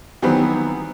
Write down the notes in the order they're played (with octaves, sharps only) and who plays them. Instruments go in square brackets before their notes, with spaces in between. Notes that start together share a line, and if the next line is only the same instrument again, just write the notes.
[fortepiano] D#3 E3 F#3 G3 B3 C4